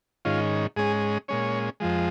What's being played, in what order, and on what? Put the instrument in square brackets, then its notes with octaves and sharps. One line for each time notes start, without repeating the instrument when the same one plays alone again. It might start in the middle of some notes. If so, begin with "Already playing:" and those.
[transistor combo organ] G#2 D#3 C#4 F4
G#2 G#3 C#4 G#4
A#2 G#3 C#4 C#5
F2 F3 G#3